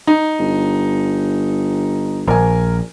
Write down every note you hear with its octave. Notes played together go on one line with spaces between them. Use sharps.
D#4
G1
A#1 A#4 G#5